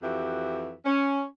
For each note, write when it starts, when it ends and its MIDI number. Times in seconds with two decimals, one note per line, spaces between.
0.02 0.75 41
0.02 0.75 52
0.02 0.75 66
0.02 0.75 67
0.02 0.75 76
0.85 1.23 61